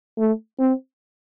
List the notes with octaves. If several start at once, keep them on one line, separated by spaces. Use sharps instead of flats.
A3
C4